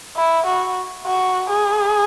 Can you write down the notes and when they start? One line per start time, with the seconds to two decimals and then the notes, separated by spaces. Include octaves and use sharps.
0.17 E4
0.46 F#4
1.06 F#4
1.50 G#4